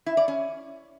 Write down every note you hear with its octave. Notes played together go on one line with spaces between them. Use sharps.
E4
D5
C#4